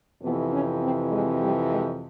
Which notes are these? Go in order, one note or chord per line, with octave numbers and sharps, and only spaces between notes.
F2 C3 E3 B3
C#4
C4
G#3
G3
G#3